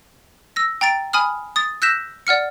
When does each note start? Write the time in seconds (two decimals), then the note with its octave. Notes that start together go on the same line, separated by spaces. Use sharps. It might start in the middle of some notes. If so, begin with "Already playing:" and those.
0.56 E6 A#6
0.81 G5 A#5 A6 D7
1.13 G#5 B5 D#6 F6
1.56 D#6 A6
1.82 E6 F#6 G6 A#6 B6 E7
2.27 D5 F#5 F6 C#7